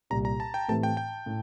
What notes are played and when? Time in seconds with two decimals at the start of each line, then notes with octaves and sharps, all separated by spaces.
0.10 C2 A#2 G3 A#5
0.25 A#5
0.40 A5
0.54 G5
0.68 A2 E3 A3 C4 G4 A5
0.83 G5
0.97 G5
1.26 A2